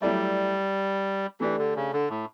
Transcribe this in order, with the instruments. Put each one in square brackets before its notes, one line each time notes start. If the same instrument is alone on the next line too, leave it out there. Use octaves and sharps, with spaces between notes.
[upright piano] F#3 A3 E4 A4 D5 [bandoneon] G3
[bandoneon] E3 [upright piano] A3 D4 G4
[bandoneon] D3
C#3
D3
A2